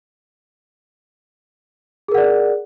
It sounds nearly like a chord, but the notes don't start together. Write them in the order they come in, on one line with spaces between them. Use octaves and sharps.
G#4 A#4 F#5 D5